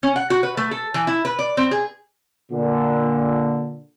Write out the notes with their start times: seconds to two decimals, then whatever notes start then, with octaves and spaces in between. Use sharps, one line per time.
0.03 C#4
0.16 F#5
0.30 F#4
0.43 B4
0.57 A3
0.71 A4
0.94 E3
1.07 E4
1.25 B4
1.39 D5
1.57 C4
1.71 G#4
2.51 A#2 D3